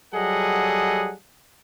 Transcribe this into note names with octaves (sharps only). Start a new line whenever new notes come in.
F#3 G3 G#4 A4 D#5 F#5